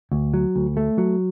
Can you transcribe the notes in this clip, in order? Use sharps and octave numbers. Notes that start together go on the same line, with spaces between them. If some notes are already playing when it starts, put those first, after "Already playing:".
D2
F#3
D2
A3
F#3